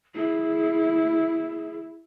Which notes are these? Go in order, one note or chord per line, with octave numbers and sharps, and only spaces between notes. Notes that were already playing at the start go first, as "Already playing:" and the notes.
E4 G#4